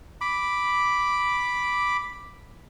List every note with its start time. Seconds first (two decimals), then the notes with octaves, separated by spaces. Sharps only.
0.21 B5 D6